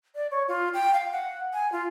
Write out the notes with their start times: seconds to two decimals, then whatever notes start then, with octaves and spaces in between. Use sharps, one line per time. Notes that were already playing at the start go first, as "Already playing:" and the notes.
0.15 D5
0.31 C#5
0.48 F4
0.74 G5
0.94 F5
1.12 F#5
1.53 G#5
1.72 F4